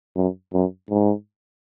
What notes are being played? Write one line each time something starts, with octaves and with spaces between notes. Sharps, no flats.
F#2
F#2
G#2